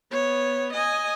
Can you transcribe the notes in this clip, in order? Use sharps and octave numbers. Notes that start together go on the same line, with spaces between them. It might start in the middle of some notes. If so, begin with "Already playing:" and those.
B3 C#5
D#5 G#5